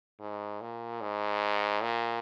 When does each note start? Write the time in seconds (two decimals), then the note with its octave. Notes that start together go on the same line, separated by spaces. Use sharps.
0.20 G#2
0.61 A#2
1.01 G#2
1.82 A#2